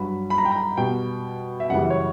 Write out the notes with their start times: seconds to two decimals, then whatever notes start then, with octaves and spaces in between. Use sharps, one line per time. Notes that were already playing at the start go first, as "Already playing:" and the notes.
Already playing: G2 F#3 B5
0.30 B5
0.38 A#5
0.45 G5
0.51 A#5
0.77 B2 G3 G5
1.60 E5
1.70 F#2 C#3 E3 G3 F#5
1.90 C#5